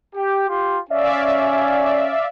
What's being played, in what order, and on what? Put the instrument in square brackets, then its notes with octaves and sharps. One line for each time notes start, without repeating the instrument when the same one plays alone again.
[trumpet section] G4
F4 G4 C6
[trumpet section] C#4 [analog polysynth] D5 E5 F5